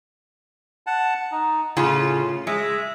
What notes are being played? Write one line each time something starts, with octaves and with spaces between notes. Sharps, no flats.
F#5 A5
D#4
A2 C#3 C#4 F4
G#3 E5